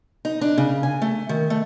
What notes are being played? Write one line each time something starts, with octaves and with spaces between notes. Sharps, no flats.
D#4
D4
C#3
G#5
A3
D#3
A3